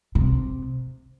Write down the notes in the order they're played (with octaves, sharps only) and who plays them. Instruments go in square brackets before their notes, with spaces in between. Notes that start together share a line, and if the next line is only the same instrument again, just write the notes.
[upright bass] C3